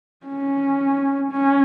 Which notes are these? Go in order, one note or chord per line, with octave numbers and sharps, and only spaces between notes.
C#4
C#4